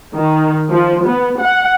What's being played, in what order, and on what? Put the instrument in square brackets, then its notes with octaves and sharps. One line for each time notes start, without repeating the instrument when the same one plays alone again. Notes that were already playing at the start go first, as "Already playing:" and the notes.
[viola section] D#3
F3
B3
F#5